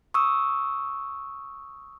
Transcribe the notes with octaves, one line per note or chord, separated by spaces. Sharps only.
C#6 D#6 E6